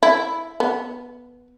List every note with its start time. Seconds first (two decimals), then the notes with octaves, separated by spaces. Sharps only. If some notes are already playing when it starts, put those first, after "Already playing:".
0.03 E4
0.60 B3